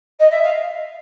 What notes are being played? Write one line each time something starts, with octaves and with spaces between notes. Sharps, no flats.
D#5
E5
F5